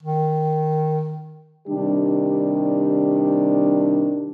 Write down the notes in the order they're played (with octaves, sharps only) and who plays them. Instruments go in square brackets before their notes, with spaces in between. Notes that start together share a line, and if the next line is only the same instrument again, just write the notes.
[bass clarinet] D#3
[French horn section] C3 D#3 G3 D4 G4